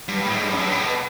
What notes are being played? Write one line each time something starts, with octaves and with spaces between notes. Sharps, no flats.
G2
A2
G#2
G2
F#2
G2
A2
B2